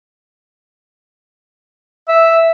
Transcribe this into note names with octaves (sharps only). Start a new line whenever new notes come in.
E5